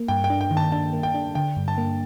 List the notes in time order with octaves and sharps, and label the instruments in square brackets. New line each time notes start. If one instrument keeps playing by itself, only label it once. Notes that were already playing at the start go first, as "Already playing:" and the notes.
Already playing: [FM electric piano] A#3
[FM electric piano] G2 [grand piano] G5
[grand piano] G5
[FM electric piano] D4
[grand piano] G5
[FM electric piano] D#3
[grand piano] A5
[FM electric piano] D4 [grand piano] A5
[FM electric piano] A#3
[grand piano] G5
[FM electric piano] D4
[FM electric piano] D3 [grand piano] G5
[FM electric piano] G2
[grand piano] A5
[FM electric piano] A#3